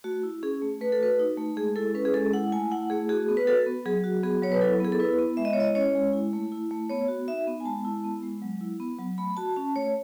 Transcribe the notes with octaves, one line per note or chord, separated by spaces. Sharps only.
A3 F#4
E4
C#4 G#4
A3
A3 B4
A4
F#4 B4
D#4
A3
G#3 G#4
E4 A4
C#4 B4
G#4
G#3 A4
E4 F#5
A3 G#5
E4 F#5
A3 G#4
F#4 G#4
B3
B4
F#4 A4
B3
F#3 G#4
F#4
B3 G#4
F#3 C#5
B4
E4 A4
B3 G#4
A4
E4 B4
B3
G#3 E5
D#5
C#5
E4 D#5
C#4 C#5
G#3
E4
A3
E4
A3
B3 C#5
F#4
D#4 E5
B3
G#5
G#3 A5
E4
B3
G#3
F#3
E4
B3
F#3
A3 B5
F#4 A5
C#4 A5
A3 C#5